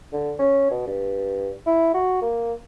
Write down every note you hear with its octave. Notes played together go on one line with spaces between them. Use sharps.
D3
C#4
B2
G2
E4
F#4
A#3